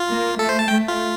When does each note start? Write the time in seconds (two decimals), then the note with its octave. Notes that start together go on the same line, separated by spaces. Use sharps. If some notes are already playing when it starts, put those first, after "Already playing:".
Already playing: F4
0.09 A#3
0.39 A3 A4
0.49 C5
0.59 A5
0.68 A3 G5
0.88 F4